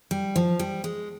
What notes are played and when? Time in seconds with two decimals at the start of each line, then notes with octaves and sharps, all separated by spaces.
0.11 G3
0.36 F3
0.59 G3
0.84 G#3